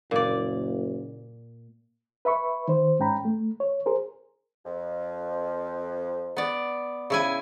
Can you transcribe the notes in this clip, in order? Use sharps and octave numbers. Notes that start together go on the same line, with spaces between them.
F#1 A#2 D5
B4 E5 B5 C#6
D#3 C5
G#2 C#4 G5 A#5 B5
A3
C#5
G#4 A#4 C5
F2
B3 D5
C#3 E4 G#5